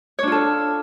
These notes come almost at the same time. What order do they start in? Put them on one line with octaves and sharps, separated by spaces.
C#5 D4 F4 A4